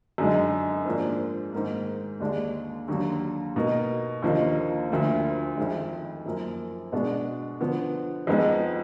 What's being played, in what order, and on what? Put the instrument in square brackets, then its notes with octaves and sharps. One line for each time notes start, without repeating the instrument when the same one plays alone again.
[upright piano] F#2 D3 G#3 D#4
G#2 F3 A#3 D4
G#2 D#3 A#3
D#2 D3 G#3 D4
D#2 D3 F#3
B2 A#3 D#4
D#2 D3 F3 A#3 D#4
D2 D3 F3 A#3
F2 D#3 G#3
F#2 F3 A#3
B2 G#3 B3 D4
D3 F3 B3
F2 F3 G#3 B3 D#4